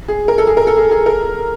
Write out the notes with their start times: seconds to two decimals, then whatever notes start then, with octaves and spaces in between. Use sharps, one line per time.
0.08 G#4
0.28 A#4
0.38 A4
0.47 G#4
0.57 A#4
0.67 A4
0.77 G#4
0.91 G#4
1.06 A#4